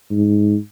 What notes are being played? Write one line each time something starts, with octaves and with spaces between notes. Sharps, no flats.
G#2